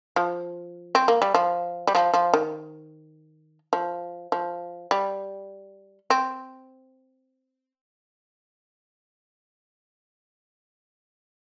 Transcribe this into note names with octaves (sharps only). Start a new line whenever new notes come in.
F3
C4
A#3
G3
F3
G3
F3
F3
D#3
F3
F3
G3
C4